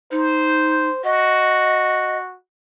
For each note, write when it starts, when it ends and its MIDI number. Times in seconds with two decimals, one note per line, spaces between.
0.11 0.89 63
0.11 1.00 72
1.04 2.35 66
1.04 2.17 75